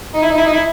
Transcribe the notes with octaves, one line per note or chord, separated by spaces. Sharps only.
D#4
E4
D#4
E4
D#4
E4